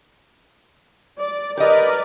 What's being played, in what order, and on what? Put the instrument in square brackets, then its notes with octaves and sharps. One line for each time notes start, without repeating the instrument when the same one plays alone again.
[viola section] D5
[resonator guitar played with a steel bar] G4 D#5 [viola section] A#4 B4 D5